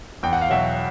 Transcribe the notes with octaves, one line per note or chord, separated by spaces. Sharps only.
E2 G5
F#5
F5
B2 F#3 E5 F#5